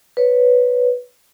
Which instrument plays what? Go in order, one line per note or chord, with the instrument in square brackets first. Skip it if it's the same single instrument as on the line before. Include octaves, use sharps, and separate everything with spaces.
[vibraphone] B4 C#5